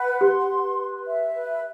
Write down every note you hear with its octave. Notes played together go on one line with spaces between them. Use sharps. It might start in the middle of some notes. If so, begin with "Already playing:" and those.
Already playing: B4 F#5
G4 C6
B4
B4
E5
B4